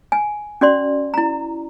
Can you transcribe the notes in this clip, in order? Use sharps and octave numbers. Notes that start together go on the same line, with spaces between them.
G#5
C#4 F#4 D5 C6
E4 A#5